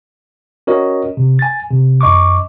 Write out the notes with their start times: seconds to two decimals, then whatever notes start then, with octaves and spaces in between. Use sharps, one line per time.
0.67 C#4 F#4 A#4 C#5 D#5
1.17 C3
1.39 G#5 A6
1.71 C3
2.01 F#2 D#5 C#6 D6